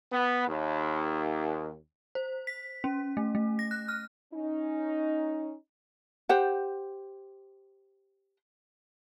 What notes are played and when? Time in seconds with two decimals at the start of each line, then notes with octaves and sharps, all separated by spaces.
0.12 B3
0.48 D#2
2.15 C5
2.47 B6
2.84 C#4
3.17 A3
3.35 A3
3.59 A#6
3.71 F#6
3.88 F6
4.34 C#4 D#4
6.29 G4 C5 F#5